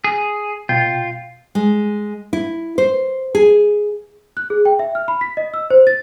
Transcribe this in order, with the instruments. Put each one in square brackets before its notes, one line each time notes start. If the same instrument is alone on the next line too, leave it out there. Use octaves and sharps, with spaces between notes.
[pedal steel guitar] G#4
[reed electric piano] B2 G5 G6 [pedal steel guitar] F4
[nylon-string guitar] G#3
E4
C5
G#4
[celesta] F#6
G#4
G5
E5
F6
B5
B6
D#5
E6
C5
A6